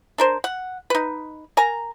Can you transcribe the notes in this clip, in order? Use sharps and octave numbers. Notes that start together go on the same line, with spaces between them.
D4 A#4 C5
F#5
D#4 B4
A#4 G#5 A#5